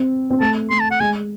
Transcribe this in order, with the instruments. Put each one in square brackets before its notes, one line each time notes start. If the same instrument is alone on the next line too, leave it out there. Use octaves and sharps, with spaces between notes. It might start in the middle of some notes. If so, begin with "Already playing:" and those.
Already playing: [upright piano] C4
C4
[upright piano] A3 [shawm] A5
[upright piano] A3 [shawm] C6
[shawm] A5
F#5
[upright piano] G#3 [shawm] G#5